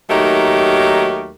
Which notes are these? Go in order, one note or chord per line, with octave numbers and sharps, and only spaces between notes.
D#2 F#3 A3 D#4 G4 A#4